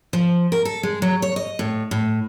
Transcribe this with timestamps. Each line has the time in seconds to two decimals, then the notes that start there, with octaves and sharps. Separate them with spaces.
0.13 F3
0.52 A#4
0.65 A4
0.83 G#3
1.02 F#3
1.22 C#5
1.36 D#5
1.59 A2
1.91 A2